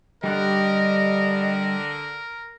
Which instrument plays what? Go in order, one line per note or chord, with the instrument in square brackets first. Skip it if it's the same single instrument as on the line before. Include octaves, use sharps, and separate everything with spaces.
[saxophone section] D3 [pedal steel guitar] G3 G4 F#6 [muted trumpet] A#4 [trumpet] D#5